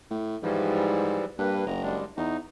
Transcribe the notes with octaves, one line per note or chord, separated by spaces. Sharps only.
A2
G#2 E3 F3 G3
G2 A#3 B4
F#1 A#5
G3 G#3 D4
E2 D#4